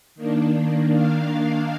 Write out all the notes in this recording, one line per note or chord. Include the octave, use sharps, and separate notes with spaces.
D#3 A#3 D4
F5